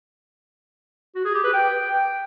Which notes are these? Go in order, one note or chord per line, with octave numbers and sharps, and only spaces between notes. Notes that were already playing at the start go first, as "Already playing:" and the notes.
F#4
G#4
G4
B4
G5